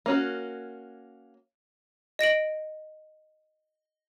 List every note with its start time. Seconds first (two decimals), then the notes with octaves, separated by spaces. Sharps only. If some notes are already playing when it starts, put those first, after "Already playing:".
0.06 A#3 C#4 F#4
2.19 D#5 A#6 D7 F#7